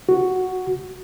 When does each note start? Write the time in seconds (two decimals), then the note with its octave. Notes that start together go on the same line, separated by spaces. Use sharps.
0.09 F#4